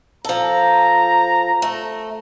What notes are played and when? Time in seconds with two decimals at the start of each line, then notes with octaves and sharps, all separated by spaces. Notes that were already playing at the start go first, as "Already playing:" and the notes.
0.25 F3 A4 A#5
1.62 A3